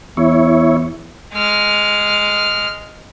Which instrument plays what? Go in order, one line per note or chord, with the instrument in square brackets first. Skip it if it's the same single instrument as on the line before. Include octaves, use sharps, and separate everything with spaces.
[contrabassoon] E2 [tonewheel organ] E4 C#5
[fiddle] G#3 F6